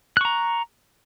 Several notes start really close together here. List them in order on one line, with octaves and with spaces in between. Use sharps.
F#6 C#6 A#5